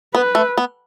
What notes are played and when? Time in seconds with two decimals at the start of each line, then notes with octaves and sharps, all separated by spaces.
0.14 B3 B4
0.35 A3
0.58 B3